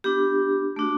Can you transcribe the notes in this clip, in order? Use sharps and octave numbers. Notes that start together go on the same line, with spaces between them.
B3 D4 F4 G4
A3 D4 F#4